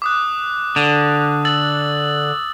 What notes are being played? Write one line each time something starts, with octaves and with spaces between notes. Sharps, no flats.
D6 D#6 F#6
D3
E6 A6 F#7